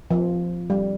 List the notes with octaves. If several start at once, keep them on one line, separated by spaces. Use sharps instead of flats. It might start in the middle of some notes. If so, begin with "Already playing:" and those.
F3
G3